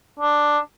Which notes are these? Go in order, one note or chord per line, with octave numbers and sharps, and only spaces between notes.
D4